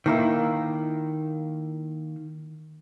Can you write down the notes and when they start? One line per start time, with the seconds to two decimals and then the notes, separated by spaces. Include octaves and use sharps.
0.06 D#3 A#3 E4